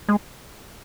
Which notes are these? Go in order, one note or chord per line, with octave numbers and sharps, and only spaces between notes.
G#3